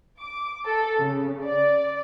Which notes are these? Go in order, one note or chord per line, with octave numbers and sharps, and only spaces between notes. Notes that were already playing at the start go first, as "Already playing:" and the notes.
D6
A4
C#3
D5